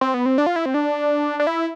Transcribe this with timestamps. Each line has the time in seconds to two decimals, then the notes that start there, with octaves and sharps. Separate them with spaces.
0.01 C4
0.14 B3
0.26 C4
0.38 D4
0.46 F4
0.56 E4
0.66 C4
0.74 D4
1.40 D4
1.47 E4